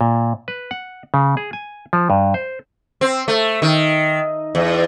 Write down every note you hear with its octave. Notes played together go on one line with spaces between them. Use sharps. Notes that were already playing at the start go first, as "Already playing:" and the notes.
A#2
B4
F#5
C#3
G#4
G#5
F3
G2
C5
C4
A3
D#3
E2